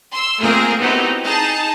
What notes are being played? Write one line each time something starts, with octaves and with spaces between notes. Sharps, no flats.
C6 E6
A3 A#3 C4 F4 G#4 A#4
B3 C4 D#4 E4 F#4 G4
D#4 G#4 A5 A#5